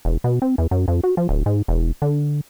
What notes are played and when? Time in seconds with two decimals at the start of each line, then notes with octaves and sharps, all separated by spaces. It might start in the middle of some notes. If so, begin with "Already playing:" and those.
0.05 E1
0.24 B2
0.42 C4
0.58 E2
0.71 F#2
0.88 F2
1.04 F#4
1.17 F3
1.29 D1
1.46 G#2
1.68 E1
2.02 D3